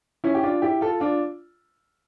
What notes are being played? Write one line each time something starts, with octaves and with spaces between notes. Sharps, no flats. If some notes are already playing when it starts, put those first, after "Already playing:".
C#4 E4
G4
D4 F4
E4 G4
F4 A4
D4 F4